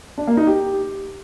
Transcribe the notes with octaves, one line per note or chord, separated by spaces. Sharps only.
D4
A#3
D#4
G4